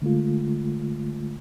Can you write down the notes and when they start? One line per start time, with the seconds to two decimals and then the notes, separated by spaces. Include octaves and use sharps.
0.02 D3 G#3 A3 F4